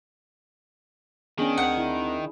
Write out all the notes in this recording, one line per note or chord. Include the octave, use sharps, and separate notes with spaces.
D#3 B3 C#4 D4 G#4
D2 C4 F#5
E4